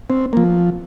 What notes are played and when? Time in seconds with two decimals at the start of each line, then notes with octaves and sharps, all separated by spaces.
0.10 C4
0.33 F3 A#3